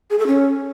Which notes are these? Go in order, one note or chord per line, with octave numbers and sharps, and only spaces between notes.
G#4
A4
C#4